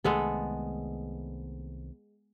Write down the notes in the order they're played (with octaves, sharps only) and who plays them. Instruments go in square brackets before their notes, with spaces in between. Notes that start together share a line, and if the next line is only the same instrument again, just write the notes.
[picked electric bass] C2 D#3 A3 [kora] G#3 B3 A4